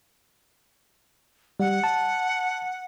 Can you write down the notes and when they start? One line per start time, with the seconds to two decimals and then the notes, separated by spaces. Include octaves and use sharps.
1.60 G3 F#5
1.84 A5